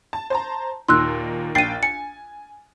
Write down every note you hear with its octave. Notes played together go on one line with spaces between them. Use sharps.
A5
C5 A5 A#5
D#2 A#2 D#4 C6 E6 F#6
A#1 G5 A6 C7 D#7
G#5 C#7